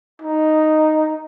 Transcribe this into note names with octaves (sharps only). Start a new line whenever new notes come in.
D#4